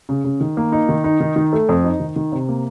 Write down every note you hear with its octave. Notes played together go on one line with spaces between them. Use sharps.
C#3
C#3
D#3
A#3
D#4
D#3
D#4
D#3
D#3
A3
F2
D#4
D#3
D#3
C3
A#3